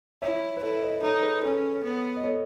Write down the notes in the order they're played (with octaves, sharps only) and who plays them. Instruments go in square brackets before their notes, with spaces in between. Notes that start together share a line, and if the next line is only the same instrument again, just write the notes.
[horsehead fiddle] E4 [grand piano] C#5 E5
[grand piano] B4
[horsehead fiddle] E4 [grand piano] A4 C#5
[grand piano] B4 D#5
[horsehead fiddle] D#4 [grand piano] A4 C#5
[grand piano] G#4 B4
[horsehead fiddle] C#4 [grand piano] A4 C#5
[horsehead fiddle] B3
[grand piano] D#5
A4 C#5